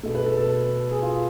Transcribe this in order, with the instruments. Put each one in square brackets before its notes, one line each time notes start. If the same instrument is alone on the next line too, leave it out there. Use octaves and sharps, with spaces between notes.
[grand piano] B2 A3 A4
B4
A4
A4
G#4
F4